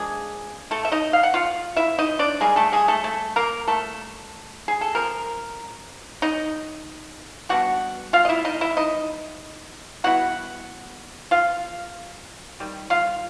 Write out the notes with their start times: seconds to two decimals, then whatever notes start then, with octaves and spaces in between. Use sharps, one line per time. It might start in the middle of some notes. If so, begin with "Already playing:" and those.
Already playing: F3 G#3 A#3 D4 G#4
0.71 A3 A4
0.85 E5
0.92 D#4 D#5
1.13 F5
1.23 F#5
1.34 F4 F5
1.77 E4 E5
1.99 D#4 D#5
2.19 D4 D5
2.40 G3 G#3 A#3 D#4 G#4
2.56 A3 A4
2.72 G#3 G#4
2.88 A3 A4
3.04 A3 A4
3.36 A#3 A#4
3.68 A3 A4
4.68 G#4
4.81 A4
4.95 C3 F3 A#4
6.22 D#4 D#5
7.49 G3 B3 D4 F#4 F#5
8.13 F4 F5
8.25 D#5
8.29 E4 E5
8.45 D#4 D#5
8.61 E4 E5
8.77 D#4 D#5
10.04 G3 B3 E4 F#4 F#5
11.31 F4 F5
12.60 D#3 G3
12.90 F4 F5